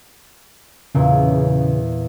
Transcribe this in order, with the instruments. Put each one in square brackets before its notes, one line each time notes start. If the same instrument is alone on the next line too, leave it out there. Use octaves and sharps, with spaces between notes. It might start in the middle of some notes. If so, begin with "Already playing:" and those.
[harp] E2 A#2 [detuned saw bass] C#3